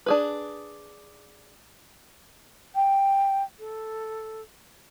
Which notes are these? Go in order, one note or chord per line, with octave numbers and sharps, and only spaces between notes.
D4 G#4 B4
G5
A4